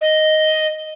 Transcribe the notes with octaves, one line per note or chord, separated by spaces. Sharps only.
D#5